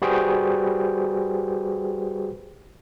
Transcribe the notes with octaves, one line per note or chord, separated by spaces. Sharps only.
G3 F#4 G#4 B4 C5 G5